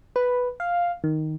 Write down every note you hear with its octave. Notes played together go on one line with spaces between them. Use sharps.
B4
F5
D#3